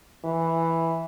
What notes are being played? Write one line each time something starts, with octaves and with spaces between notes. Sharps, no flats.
E3